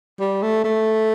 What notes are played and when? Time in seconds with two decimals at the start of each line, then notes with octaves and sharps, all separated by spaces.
0.20 G3
0.43 A3
0.64 A3